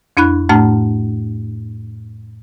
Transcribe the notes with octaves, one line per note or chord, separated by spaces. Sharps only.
F2 D4 E4 B5 F#6
A2 A3 D4 A5 A#5 F6